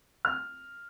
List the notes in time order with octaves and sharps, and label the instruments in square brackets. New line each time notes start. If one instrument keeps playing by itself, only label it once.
[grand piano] F6